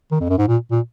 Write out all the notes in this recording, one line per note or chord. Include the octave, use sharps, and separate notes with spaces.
D#3
F2
F#2
G#2
A#2
A#2